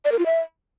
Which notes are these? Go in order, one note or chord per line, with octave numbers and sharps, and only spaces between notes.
D5
A#4
F4
E5